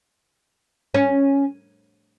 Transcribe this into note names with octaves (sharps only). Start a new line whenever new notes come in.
C#4